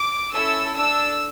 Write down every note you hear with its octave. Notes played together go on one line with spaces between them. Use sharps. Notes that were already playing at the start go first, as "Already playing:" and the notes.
Already playing: D6
C#4 E4 A4 E6
D4 A4 E6